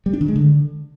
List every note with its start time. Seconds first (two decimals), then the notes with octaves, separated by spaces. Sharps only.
0.06 G3
0.13 D4
0.21 D#3
0.28 G#3
0.36 D3